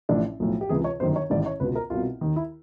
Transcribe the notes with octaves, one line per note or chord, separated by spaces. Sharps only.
A1 A2 F3 D4
B1 A2 F3
G4
C#2 C3 E3 G#4
C#5
G1 F#2 D#3 C5
C#5
A1 G#2 D#3 D5
C#5
C#2 B2 B4
A#4
C2 B2 F4
D#2 D#3
E4